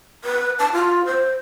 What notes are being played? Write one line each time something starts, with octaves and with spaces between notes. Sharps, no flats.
B4
A5
F4
C5